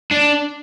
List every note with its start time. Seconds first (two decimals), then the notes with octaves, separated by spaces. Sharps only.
0.11 D4